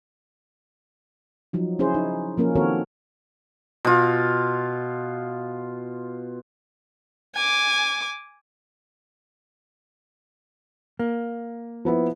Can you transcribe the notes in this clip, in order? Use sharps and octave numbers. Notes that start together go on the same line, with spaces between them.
F3 F#3 D#4
C#4 E4 G#4 C5
D#4
F3 A#3 C#4 A#4
D#3 C4 F#4 A4 A#4 C#5
B2 F4
G#5 D6
A#3
F3 B3 E4